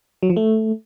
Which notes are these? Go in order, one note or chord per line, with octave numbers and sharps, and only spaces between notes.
F#3
F3
A3